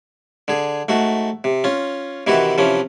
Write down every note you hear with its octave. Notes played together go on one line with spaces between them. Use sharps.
D3 G#4
G#2 A3 F#4
C3
C#4 F4
C3 D#3 E3 E4 F#4
C3 E3 F3 C#4